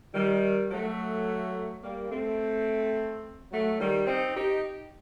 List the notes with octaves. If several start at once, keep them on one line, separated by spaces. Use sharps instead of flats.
D#3 G3
F#3 A3
G3 A#3
A3 C4
F#3 A3
D#3 G3
C4 D#4
D#4 G4